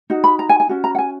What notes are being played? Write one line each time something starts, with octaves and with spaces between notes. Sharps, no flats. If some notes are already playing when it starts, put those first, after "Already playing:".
D#4 F#4
B5
A#5
G#5
G#5
C#4 F#4
A#5
F#5
G#5